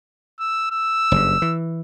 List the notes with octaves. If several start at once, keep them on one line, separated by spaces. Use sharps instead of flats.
E6
E6
F#1 G2
E3